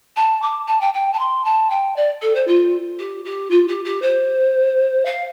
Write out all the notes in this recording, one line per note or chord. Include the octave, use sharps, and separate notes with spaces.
A5
D6
A5
G5
G5
A5
C6
A5
G5
D5
A4
C5
F4
G4
G4
F4
G4
G4
C5
F5